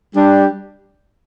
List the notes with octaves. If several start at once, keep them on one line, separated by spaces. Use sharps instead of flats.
G3 D4 G4